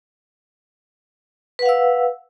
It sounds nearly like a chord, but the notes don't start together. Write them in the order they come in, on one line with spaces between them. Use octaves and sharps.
B4 F#5 F5 E6